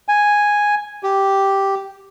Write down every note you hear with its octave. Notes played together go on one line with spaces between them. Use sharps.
G#5
G4